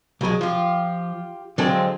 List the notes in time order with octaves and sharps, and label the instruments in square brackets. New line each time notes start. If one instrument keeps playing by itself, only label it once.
[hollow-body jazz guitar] C2 F#3 [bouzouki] B2 G#3
[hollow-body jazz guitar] F3 [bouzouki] F4 G4
[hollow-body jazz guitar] D3 F#3 A4 [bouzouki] F3 G#3 C4